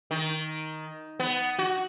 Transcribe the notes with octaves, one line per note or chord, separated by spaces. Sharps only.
D#3
B3
F#4